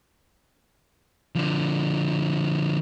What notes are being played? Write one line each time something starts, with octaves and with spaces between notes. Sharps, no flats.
D3 F3